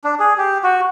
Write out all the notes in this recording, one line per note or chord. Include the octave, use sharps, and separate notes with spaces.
D4
G#4
G4
F#4